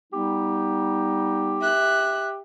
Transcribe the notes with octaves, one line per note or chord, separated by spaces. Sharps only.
G3 B3 D#4 G4
E5 F#6